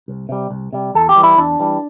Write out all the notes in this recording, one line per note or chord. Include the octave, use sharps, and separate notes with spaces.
C2
C3 G3
C2
C3 G3
E2 A4
G4
E3 G3
E4
E2 D4
E3 G3